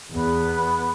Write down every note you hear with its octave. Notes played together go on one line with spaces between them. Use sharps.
E2 B3